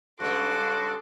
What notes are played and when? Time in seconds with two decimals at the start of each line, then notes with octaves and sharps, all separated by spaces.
0.20 G2 C#3 G#3 F#4 A4 C6 D6